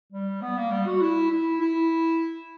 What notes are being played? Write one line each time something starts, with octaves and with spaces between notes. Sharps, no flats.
G3
B3
A#3
G3
F#4
E4
E4
E4